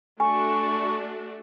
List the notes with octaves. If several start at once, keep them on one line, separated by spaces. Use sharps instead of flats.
A3 D4 F#4 G#5 C#6